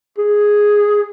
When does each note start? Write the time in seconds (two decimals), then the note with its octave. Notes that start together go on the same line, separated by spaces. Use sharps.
0.18 G#4